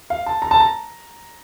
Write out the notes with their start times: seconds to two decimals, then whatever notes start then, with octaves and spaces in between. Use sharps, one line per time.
0.10 F5
0.26 A5
0.42 A#5
0.51 A5
0.60 A#5